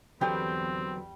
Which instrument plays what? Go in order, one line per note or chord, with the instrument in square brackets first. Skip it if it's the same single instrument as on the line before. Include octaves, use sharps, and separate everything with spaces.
[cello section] E2 [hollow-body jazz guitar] D3 F#3 B3 [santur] G3 G5 [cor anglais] C4